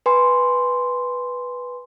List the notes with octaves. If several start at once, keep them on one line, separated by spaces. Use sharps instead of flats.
B4 G#5 C6